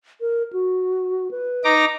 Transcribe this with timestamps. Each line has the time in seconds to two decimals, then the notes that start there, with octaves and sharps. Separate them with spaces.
0.21 A#4
0.53 F#4
1.31 B4
1.64 D#4 A#5 D6